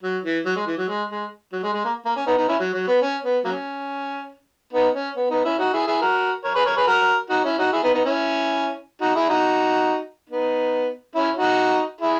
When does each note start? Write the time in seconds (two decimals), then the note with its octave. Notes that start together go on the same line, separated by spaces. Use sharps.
0.03 F#3
0.24 E3
0.45 F#3
0.56 G#3
0.66 E3
0.77 F#3
0.88 G#3
1.10 G#3
1.52 F#3
1.63 G#3
1.73 G#3
1.85 A#3
2.05 A#3
2.16 C#4
2.27 B3 D#4
2.38 B3 D#4
2.48 C#4 E4
2.59 F#3
2.74 F#3
2.88 B3
3.02 C#4
3.23 B3
3.44 F#3 A#3 C#4
4.73 B3 D#4
4.95 C#4
5.16 B3
5.30 B3 D#4
5.45 C#4 E4
5.59 D#4 F#4
5.73 E4 G#4
5.87 E4 G#4
6.02 F#4 A#4
6.44 A#4 C#5
6.55 G#4 B4
6.65 A#4 C#5
6.77 G#4 B4
6.87 F#4 A#4
7.30 D#4 F#4
7.44 C#4 E4
7.58 D#4 F#4
7.72 E4 G#4
7.83 B3 D#4
7.94 B3 D#4
8.05 C#4 E4
9.01 D#4 F#4
9.15 E4 G#4
9.29 D#4 F#4
10.29 B3 D#4
11.15 C#4 E4
11.36 D#4 F#4
12.00 E4 G#4